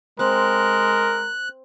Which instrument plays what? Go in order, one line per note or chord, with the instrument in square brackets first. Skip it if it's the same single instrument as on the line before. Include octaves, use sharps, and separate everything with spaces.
[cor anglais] G#3 [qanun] C4 [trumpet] A#4 [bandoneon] F#6